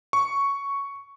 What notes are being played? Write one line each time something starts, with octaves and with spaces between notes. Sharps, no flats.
C#6